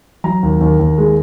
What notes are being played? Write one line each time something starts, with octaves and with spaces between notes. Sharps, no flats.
F#3 A#5
D#2
D#2
D#2
G#3